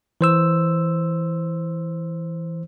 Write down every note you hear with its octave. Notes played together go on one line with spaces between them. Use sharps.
E3 C5 E6